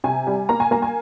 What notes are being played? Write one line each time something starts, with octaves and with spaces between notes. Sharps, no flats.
C3 G#5
G3
A#3 A#5
G#5
A#3 A#5
G#5